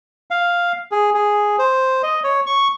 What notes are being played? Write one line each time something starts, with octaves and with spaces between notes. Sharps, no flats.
F5
G#4
G#4
C5
D#5
C#5
C#6